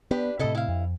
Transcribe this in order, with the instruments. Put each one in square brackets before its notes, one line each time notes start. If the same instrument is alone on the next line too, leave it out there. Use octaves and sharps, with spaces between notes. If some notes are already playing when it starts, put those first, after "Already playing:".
[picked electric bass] B3 [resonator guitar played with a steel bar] D4 G4 B4
[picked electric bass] A2 C3 [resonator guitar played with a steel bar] E4 A4 D#5
[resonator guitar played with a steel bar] E4 F5
[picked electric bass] F2